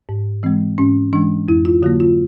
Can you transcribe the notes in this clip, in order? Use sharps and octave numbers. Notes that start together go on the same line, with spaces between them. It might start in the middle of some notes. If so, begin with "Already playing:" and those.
G#2
E3 G#3 C4
G#2 C#4
E3 G#3 D4
F2 E4
F4
D3 F#3 A#3 F#4
F4